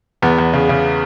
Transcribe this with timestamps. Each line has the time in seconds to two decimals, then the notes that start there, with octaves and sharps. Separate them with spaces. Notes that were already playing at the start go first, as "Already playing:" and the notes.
0.22 E2 B3
0.39 E2
0.53 C#3
0.69 C#3